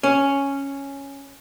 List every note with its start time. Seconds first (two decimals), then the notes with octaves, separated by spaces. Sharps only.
0.03 C#4